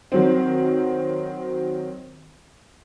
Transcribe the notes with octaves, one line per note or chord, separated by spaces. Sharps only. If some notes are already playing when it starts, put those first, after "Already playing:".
D#3 F#3 C4